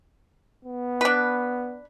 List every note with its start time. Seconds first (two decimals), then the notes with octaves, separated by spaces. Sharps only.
0.65 B3
1.01 D4 B4